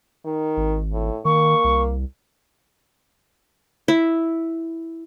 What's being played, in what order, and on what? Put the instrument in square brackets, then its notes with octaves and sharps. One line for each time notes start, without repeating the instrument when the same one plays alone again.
[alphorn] D#3
[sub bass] G#1
[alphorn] A2
[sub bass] D#3 [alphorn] A#3 [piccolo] C#6
[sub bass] C2
[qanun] E4